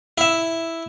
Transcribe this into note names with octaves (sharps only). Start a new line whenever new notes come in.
E4 E5